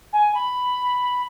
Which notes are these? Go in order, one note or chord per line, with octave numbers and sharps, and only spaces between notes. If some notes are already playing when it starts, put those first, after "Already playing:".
G#5
B5